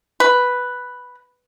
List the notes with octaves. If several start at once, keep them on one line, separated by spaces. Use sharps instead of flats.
B4